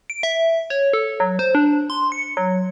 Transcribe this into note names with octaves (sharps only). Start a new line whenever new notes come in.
D7
E5
C#5
A4
F#3
C5
D4
C6
C#7
F#3